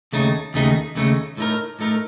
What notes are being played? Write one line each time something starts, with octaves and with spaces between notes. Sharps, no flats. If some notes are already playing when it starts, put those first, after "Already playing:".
D#2 C#3 A3 D#4
D#2 C#3 A3 D#4
D#2 C#3 A3 D#4
A2 A3 D#4 A#4
A2 A3 D#4 A#4